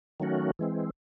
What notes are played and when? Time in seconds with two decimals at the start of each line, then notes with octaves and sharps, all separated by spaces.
0.20 D#3 F#3 A3 C#4 F#4
0.59 E3 G#3 C4